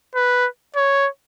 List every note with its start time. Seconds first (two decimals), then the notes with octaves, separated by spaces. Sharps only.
0.15 B4
0.76 C#5